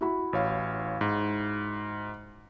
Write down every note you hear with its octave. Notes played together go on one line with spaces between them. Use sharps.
E4 F#4 B5
A1 C#5 F5
G#2